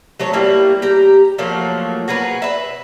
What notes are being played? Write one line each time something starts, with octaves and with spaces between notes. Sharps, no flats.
F#3 A3 C#5
G3 A#3 C4 E4
G4 A#5
F3 F#3 A3 A#3
F#4 G#4 A#4 B4
B4 E5